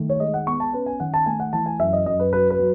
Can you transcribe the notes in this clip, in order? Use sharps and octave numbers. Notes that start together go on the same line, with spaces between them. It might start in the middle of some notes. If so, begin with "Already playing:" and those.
Already playing: D#3 A3
C#5
G#3 D#5
F#5
B3 C#6
A5
C#4 B4
G#5
D#3 F#5
A5
A3 G#5
F#5
E3 A5
G#5
F#2 E5
D#5
F#2 D#5
B4
F#3 B4
B4
F#3